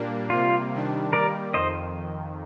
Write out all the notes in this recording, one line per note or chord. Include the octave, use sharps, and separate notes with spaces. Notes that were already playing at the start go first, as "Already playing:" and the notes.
Already playing: A#2 G3 A#3 D4
C3 G3 A#3 F4
C3 D#3 G3 D4
D#3 G3 A#3 A#4 D5
F2 D#3 C5 D#5